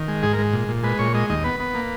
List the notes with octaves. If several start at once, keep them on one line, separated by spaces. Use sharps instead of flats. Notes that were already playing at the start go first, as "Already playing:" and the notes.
Already playing: D#3
G#3
G#2 G#4
A#4
G#3
A#2
A#2
G#3 B4
A#2 C#5
G#3 D#5
D#2 D#5
B3 B4
B3
A#3